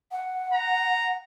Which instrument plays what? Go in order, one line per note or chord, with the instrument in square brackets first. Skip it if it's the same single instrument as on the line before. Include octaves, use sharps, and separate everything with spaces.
[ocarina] F#5
[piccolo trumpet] A#5